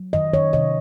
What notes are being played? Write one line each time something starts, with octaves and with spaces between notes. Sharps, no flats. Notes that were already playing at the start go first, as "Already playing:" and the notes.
Already playing: F#3
D#3 D#5
D#3 C#5
C3 D#5